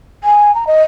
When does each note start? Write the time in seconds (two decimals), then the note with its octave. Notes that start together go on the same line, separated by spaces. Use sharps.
0.24 G#5
0.55 A#5
0.67 D#5